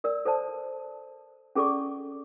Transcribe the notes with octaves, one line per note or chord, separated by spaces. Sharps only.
A#4 D5 E6
A4 C5 D5 A5
C#4 G#4 A4 D5 C#6 D6